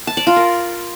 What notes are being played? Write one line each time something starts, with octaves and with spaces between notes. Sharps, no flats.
A5
D5
F4
A#4